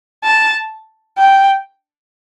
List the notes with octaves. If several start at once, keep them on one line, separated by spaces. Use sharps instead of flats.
A5
G5